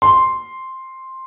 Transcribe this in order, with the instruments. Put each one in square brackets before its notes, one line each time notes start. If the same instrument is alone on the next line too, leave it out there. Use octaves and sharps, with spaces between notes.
[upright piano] C6